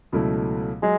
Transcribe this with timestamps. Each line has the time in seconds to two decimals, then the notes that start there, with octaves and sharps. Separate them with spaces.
0.12 C#2 B2 F#3 A3 E4
0.83 F#3 G#3